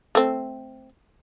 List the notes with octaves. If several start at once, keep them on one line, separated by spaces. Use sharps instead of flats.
A3 C4